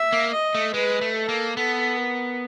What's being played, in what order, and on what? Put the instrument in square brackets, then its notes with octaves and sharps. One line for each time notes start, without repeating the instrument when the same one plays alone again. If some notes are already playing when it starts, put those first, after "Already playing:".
Already playing: [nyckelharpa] E5
[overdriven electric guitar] A#3
[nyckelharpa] D#5
[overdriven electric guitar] A3
[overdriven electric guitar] G#3 [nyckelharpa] B4
[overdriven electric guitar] A3
[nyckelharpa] A4
[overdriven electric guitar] A#3
[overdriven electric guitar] B3 [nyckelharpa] A4
[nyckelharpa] A#4